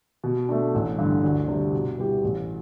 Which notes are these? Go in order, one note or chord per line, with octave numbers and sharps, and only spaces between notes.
B2
A3 D4
A1
G2 D3
D2
C3 G3 D4
B2
G3 B3 E4 G4
A1